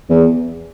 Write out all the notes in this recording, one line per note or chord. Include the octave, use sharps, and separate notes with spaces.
E2